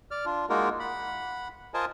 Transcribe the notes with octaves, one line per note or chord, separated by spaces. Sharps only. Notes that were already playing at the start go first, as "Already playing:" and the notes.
D5 F6
D4 F4
G#3 A#3 D#4 F4 F#4 A#4
F#5 B5
F4 A#4 C5 D#5 G#5 A5